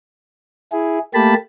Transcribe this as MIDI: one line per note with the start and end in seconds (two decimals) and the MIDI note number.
0.72 0.99 64
0.72 0.99 68
1.14 1.34 57
1.14 1.34 58
1.14 1.34 67
1.14 1.34 81
1.14 1.34 83